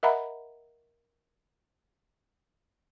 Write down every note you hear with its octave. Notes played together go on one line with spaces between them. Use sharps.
A#4 D#5 E5 F#5 A#5 B5